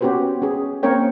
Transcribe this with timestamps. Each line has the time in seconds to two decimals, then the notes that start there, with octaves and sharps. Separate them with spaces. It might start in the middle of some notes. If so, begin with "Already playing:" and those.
0.01 B3 C#4 F#4 G4 B4 C5
0.42 C#4 G#4
0.83 A#3 C4 C#4 A#4 C#5 G5